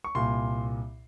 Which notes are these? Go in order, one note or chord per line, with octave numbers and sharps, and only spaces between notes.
C#6
C2 A#2 C6